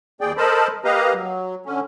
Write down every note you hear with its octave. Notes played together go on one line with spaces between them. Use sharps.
D#2 G#4 D5 G5
A4 A#4 C5 D#5 A5 B5
A#3 G4 B4 D#5 F5 A#5
F#3
D3 C#4